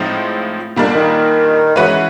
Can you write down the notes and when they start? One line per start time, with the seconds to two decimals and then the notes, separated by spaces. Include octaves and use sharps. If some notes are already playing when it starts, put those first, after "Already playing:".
Already playing: A2 F3 G#3 C4 D#4
0.76 A#2 D#3 G3 A#3 D4
0.85 D3
0.94 D#3
1.76 E3 G#3 C#4 F#4 B4